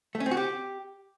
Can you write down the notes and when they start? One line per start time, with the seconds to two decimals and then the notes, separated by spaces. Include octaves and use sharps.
0.15 A3
0.20 C#4
0.26 C4
0.31 F#4
0.37 G4